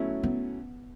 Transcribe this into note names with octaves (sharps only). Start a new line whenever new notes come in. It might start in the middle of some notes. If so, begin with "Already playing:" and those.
Already playing: B2 F#3 A3 C#4 E4
B3